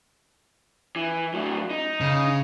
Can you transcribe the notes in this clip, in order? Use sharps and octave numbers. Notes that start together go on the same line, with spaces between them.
E3
A2 F#3
D#4
C#3